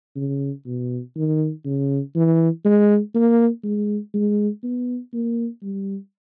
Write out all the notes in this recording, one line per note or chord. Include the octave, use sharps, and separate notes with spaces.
C#3
B2
D#3
C#3
E3
G#3
A#3
G#3
G#3
B3
A#3
G3